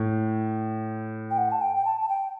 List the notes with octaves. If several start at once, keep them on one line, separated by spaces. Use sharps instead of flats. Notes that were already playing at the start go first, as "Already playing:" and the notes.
Already playing: A2
G5
F#5
A5
G5
G5
A5
A5
G5